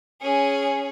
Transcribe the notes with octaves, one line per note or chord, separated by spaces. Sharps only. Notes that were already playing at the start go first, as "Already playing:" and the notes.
C#4 G#4